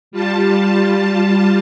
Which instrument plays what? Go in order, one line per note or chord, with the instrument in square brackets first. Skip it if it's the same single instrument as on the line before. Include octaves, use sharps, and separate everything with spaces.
[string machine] G3 F4 A5